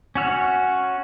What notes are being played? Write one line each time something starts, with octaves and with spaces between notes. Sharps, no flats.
C#4 F#4 F6